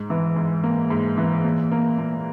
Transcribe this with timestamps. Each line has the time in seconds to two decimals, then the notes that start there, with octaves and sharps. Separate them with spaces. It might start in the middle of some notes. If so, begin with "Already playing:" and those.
Already playing: G#2
0.10 E3
0.36 G#2
0.64 A#3
0.90 G#2
1.18 E3
1.44 A#2
1.72 A#3
1.98 A#2